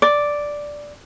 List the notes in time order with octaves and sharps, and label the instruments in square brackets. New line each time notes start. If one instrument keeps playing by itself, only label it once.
[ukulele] D5